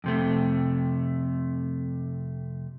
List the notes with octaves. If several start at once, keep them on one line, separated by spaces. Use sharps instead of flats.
F2 C3 A3